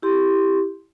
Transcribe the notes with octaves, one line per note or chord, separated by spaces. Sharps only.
E4 G4 C6